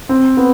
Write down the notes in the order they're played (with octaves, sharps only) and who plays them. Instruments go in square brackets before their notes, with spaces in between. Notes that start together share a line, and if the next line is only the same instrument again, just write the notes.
[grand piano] C4
B3